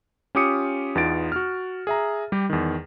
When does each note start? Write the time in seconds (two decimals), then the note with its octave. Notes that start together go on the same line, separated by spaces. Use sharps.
0.35 C#4 F4 G4 D6 D#6 C#7
0.95 E2 B3 D#4 F4 A6 D7
1.32 F#4 F6
1.87 G#4 E5 A#5
2.32 G3 G4
2.50 E2 D#3